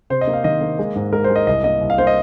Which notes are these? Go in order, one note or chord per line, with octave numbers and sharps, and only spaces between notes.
C3 C5
D#5
A#3
F5
D#3 D#5
A#3
G#3
G#2
G#3 A#4
C5
G#3
D#5
C2 D#5
A#3 D#5
C2
F5
A#3 C5
D#5